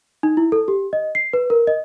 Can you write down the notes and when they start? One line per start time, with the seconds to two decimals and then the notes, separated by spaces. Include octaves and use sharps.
0.23 D#4
0.37 E4
0.52 A4
0.68 G4
0.93 D#5
1.15 C7
1.33 B4
1.50 A#4
1.67 D#5